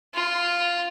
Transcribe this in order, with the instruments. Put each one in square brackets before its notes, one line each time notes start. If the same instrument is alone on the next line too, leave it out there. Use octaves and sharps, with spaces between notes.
[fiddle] F4